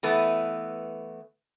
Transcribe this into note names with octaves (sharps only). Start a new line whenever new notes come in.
E3 A3 B3